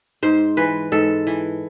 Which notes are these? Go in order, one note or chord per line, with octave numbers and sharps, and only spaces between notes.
G#2 C5
E3 B4
G#2 A4
E3